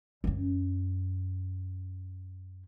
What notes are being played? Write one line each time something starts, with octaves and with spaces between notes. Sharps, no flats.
F#2 C#4